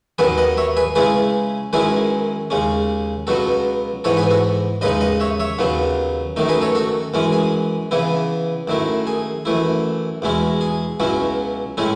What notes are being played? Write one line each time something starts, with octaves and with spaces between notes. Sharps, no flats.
D#2 D#3 F#3 B3 G#4 B4
D#5 F#5
C#5 E5
G#4 B4
C#3 G#3 C#4 E4 G#4 B4
F#2 D#3 G#3 C#4 E4 G#4 B4
D#2 C#3 G#3 C#4
C#2 B2 F#3 B3 F#4 A4
G#2 E3 B3 A4 C#5
G#4 B4
F#4 A4
D#2 C#3 G#3 D#4 B4 D#5
D#5 F#5
C#5 E5
C#5 E5
D#2 C#3 F#3 B3
F#2 D#3 A3 D#4
G#4 B4
A4 C#5
F#4 A4
F#2 E3 G#3 C#4
G#4
C#3 E3 B3 E4
F#2 D#3 A3 E4
G#4
F#2 E3 A3 E4
E2 B2 G#3 C#4 E4
G#4
C#2 B2 F#3 C#4 E4
A2 G#3 C#4 E4